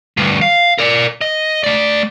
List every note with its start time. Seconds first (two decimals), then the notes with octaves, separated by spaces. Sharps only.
0.17 D2 G2
0.42 F5
0.79 A#4 D5
1.21 D#5
1.64 A3 D5